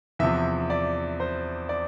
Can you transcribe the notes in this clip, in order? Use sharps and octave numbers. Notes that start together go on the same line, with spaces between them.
E2 C3 F3 E5
D5
C5
D5